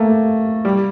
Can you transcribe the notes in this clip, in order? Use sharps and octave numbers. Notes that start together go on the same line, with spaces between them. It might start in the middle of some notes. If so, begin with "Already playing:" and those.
Already playing: A3 A#3
G3